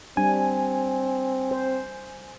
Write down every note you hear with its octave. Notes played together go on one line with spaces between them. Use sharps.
G3 C4 D4 G#5
C5